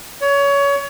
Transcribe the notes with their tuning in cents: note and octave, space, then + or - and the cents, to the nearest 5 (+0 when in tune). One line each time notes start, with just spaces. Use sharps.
C#5 +25